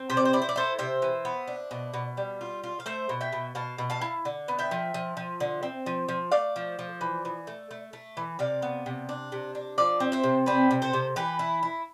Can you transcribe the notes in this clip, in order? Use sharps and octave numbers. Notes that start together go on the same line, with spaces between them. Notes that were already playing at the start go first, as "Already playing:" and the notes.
Already playing: C4
C3 C5
D5
C5
E4 D5
C5
D5
E4 A4 C5
C3 C5 E5
E3
B3
D4
B2
B2
G3
F4
F4
F5
A3 C5 E5
B2
E5 G5
B2
B2 F5 A5
B2
F5 A5
E4
D3
B3
E5 G5
F3
F3
F3
D3
C4
F3
F3
A3 D5 F5
F3
F3
E3
E3
A3
A3
A3
E3
C3 D5 F5
B3
C3
D4
C3
D4
F3 D5 F5
C4
C5 E5
C3
C4 B4 D5
C3
A4 C5
C3
E3 G4 B4
E4
E4